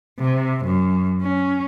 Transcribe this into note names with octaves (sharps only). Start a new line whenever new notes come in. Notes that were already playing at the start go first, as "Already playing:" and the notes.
C3
F#2
C#4